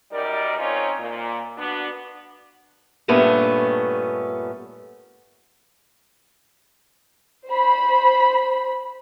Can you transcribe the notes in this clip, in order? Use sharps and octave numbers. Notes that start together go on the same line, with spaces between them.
F#2 G3 D#4 A#4 D5
C4 C#4 D#4 F4 A#4 C#5
A#2
B3 D4 F#4
G2 A#2 A3 B3 C#4
C5 B5